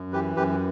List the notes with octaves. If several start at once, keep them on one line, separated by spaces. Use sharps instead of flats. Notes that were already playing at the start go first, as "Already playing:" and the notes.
Already playing: F#2
E3 G4 B4
F#2 G4 B4